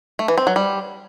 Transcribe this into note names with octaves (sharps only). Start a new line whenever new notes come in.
A3
E3
C4
F#3
G3